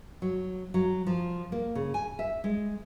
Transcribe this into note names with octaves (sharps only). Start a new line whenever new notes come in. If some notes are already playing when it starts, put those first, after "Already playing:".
F#3
F#3
F3
A#3
C#3
G#5
E5
G#3